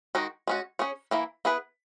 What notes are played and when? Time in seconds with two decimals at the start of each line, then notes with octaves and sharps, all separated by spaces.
0.15 D#3 G#3 D#4 F#4
0.47 G#3 C#4 F#4
0.79 C#4 G#4 C#5
1.11 E3 A#3 E4
1.45 B3 E4 G#4 B4